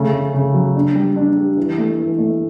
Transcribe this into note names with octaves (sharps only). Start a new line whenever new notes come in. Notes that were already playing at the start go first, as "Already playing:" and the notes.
Already playing: C#3 A3
C#3
C#3
F#3
D4
G3
D4
G4
E3
A3
E3
A3